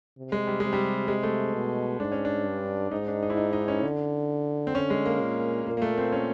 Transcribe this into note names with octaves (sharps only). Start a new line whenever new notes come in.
C3
G#3
G3
C3 G#3
G3
G#3
A3
B2
G#2 D4
C#4
D4
G2
G#2 D#4
D4
D#4
E4
D#4
D#4
C#4
D3
C4
D3 C#4
G#3
A#3
A#2
A#2 A#3
A#3
A3
C4
C#4